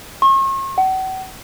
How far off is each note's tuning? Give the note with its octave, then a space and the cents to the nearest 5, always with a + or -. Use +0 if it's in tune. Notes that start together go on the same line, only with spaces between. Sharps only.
C#6 -45
F#5 +40